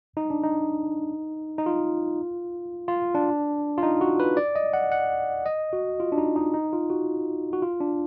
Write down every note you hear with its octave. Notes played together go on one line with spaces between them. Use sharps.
D#4
D4
D#4
D#4
F4
F4
D4
F4
D#4
F#4
B4
D5
D#5
F#5
F#5
D#5
F#4
F4
D4
D#4
D#4
D#4
F4
F#4
F#4
F4
D4